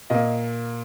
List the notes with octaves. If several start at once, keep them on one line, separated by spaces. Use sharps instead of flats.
A#2 A#3 D#5